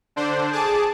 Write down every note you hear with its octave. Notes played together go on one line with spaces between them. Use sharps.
D3 D4 C5
G#4 A5 D6